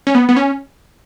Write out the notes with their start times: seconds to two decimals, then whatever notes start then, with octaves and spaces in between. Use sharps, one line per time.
0.07 C#4
0.15 B3
0.29 B3
0.36 C#4